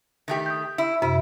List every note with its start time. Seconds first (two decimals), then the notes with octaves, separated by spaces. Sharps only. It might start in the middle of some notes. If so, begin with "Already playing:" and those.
0.28 D#3 A3 G4
0.46 D#6 G6
0.78 E4
1.02 F#2 C3 E4